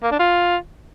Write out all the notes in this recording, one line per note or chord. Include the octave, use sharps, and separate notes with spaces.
A#3
D4
F4